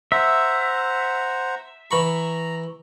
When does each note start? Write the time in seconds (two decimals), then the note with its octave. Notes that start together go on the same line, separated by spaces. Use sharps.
0.12 C5 E5 F#5 A#5
1.91 E3 A#5 B5 C#6